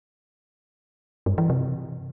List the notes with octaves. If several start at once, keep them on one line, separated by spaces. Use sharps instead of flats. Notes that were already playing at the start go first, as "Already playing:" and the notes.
G2
E3
C3